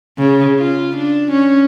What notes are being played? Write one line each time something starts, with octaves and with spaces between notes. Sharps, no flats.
C#3
F4
D4
C#4